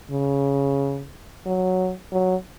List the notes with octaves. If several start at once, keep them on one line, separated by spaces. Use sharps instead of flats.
C#3
F#3
F#3